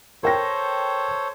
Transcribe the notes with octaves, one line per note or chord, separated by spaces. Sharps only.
A4 A#4 C5 C#5 G5 A#6